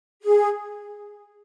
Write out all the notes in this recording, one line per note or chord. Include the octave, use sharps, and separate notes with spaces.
G#4